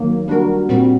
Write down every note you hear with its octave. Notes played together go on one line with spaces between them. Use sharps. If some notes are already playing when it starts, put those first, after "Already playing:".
Already playing: D#3 F#3 A#3
G3 D4 F#4 A#4
A#2 G3 C4 F#4